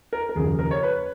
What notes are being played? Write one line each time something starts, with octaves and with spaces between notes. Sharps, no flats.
A#4
A#4
D#2 C#3 F3 G#4
A#4
C#5
B4